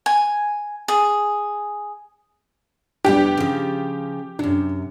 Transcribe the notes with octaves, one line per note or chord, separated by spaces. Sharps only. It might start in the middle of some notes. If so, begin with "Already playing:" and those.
G#5
G#4
F2 C3 G3 B3 D4 G4
C#3 F3
F#2 C3 D4